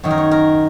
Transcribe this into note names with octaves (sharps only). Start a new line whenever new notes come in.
F#2 D#3 C#5
A#4
C#5
A#4